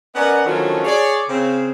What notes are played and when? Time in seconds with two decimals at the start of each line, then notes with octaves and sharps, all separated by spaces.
0.15 B3 C#4 A#4 D5 D#5 F#5
0.45 D3 D#3 F3 F#3 A3 C#4
0.84 G#4 C#5 D5
1.28 C#3 C4